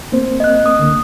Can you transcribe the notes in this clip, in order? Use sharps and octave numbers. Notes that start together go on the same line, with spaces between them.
A#3 C4 C5
A#3 C4 D#5 F#6
D#6
C#2 D3 A#3